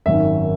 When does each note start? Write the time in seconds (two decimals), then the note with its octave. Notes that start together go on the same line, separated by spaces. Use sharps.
0.06 G#1 F#2 D#3 E5